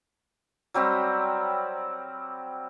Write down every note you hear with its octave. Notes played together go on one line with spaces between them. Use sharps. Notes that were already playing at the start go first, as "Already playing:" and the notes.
F#3 G3 C4 G4